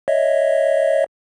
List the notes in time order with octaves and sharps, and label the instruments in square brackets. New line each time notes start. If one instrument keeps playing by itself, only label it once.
[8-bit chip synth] C#5 D#5 E5